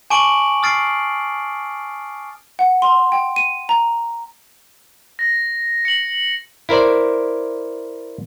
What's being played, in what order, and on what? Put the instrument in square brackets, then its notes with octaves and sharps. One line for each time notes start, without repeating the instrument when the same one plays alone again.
[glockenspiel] G#5 A5 C#6 D6 D7 F#7
D#6 F6 A6 C7 D7
[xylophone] F#5
C6
G5
D#7
A#5
[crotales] A#6
C#7 F#7
[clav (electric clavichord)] E4 A#4 C5 D5